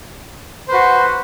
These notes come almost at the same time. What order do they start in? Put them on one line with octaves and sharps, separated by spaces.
C5 B4 F#4